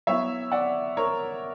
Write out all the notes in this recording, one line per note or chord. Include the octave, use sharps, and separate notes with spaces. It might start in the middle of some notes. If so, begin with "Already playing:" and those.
F#3 B3 E4 C#5 E5
D5 F#5
A#4 C#5